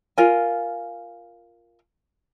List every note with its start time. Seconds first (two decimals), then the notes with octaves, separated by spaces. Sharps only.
0.18 F4 A#4 G#5